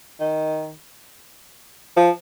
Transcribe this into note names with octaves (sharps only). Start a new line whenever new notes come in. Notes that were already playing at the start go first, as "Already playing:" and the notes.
D#3
F3